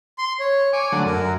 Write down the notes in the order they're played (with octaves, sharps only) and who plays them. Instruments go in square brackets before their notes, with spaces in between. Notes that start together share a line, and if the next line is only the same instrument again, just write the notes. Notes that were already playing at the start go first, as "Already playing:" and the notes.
[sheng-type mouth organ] C6
C#5
[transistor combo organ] C#5 D6 [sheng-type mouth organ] G#5
[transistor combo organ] D3 F#3 A3
[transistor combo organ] F#2 [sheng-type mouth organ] A#4